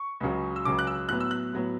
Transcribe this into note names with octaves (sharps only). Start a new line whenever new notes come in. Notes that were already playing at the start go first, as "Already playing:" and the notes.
Already playing: C#6
C#2 C#3 F#3
E6
C#2 C#3 F#3 D6
F#6
E6
A2 F#3 B3 F#6
E6
F#6
A2 F#3 B3